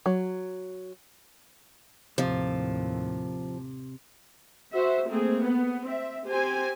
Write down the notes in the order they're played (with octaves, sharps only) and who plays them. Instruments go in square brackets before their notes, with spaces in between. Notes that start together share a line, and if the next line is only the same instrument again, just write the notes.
[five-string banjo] F#3
[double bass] D#2 A2 [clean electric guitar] C3 [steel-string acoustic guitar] F3
[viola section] F#4 C5 E5
A3 A#3 C4 G#4
B3
C4 E5
C4 G4 C5 G#5